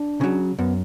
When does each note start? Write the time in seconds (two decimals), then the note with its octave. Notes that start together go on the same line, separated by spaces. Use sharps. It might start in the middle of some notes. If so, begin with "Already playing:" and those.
Already playing: D4
0.21 C#3 F#3
0.59 F#2 B3